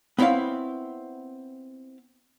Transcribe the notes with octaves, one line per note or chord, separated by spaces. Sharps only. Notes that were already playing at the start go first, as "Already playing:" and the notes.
B3 C4 E4 C#5 F5